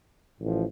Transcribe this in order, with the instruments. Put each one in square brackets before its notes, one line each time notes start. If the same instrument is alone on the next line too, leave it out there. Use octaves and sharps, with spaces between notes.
[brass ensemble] A1 A2 F3